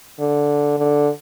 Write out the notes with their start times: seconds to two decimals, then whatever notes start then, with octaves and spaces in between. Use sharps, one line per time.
0.20 D3
0.78 D3